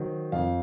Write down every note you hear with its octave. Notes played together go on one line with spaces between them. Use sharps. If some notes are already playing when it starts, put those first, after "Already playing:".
Already playing: D#3 F#3 C5
F2 F5